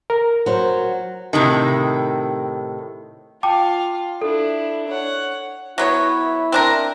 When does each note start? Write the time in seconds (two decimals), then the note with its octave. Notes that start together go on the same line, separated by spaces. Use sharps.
0.10 A#4
0.46 F#3 C5
1.33 A2 C3 D#3
3.43 F4 F5 G5 A5 D6
4.22 D4 E4 A4
4.88 C#5 F#5
5.78 F#3 B3 E4 C#5
6.52 C4 D4 A#4